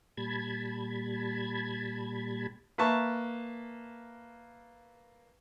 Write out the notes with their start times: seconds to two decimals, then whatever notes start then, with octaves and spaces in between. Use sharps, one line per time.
0.17 A#2 G3 A5 B5 G#6
2.78 A#3 B4 E5 A5 C#6